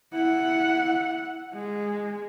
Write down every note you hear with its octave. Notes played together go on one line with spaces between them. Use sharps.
E4 F#5
G#3